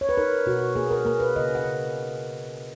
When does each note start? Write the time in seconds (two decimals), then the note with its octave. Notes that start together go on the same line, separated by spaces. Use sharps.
0.01 C#5
0.09 B4
0.17 D#4 A#4
0.46 B2 F#4
0.76 A#3 G#4
0.91 A#4
1.05 A#3 A#4
1.20 B4
1.36 C#3 D#5
1.55 F#5
1.65 C#3